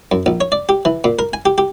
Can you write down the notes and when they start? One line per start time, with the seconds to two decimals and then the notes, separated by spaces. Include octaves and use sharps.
0.12 F#2
0.26 A#1
0.41 C#5
0.52 D5
0.69 G4
0.85 E3
1.04 A#2
1.19 A#4
1.33 G#5
1.46 G4
1.58 G4